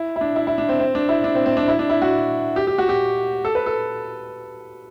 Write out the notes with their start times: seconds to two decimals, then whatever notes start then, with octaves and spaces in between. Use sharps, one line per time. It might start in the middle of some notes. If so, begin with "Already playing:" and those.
Already playing: E4
0.16 E4
0.21 D4
0.36 E4
0.47 E4
0.58 D4
0.69 C4
0.80 C4
0.95 D4
1.09 E4
1.24 D4
1.35 C4
1.46 C4
1.57 D4
1.68 E4
1.79 D4
1.89 E4
2.02 F#4
2.56 G4
2.67 G4
2.78 F#4
2.89 G4
3.45 A4
3.55 B4
3.66 A4